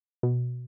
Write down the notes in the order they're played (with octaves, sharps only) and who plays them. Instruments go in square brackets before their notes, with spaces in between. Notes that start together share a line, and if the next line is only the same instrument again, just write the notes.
[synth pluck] B2